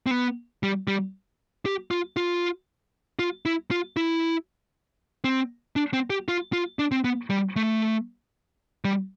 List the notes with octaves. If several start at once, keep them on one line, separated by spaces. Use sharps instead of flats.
C4
B3
G3
G3
G4
F4
F4
F4
E4
F4
E4
C4
D4
C4
G4
F4
F4
D4
C4
B3
G3
A3
G3